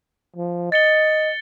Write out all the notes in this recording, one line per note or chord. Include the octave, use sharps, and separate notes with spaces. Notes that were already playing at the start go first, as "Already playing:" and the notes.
F3
D#5 A6 C#7 G7